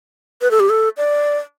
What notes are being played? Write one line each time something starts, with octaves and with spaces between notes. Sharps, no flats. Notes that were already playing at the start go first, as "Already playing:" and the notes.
B4
A4
G4
A4
D5